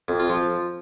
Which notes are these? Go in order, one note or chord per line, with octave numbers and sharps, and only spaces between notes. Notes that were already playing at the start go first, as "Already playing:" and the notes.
F2
F4
F3